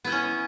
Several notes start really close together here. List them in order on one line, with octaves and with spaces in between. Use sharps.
B3 E4 D#5 C#4